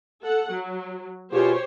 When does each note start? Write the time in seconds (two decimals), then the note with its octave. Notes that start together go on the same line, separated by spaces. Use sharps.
0.23 A4 F#5
0.52 F#3
1.32 B2 F4 G4 G#4 C5 C#5